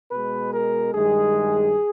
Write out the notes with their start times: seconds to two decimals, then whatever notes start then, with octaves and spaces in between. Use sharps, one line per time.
0.11 B2 G#3 B4
0.52 A#4
0.93 G2 D#3 G#3 G#4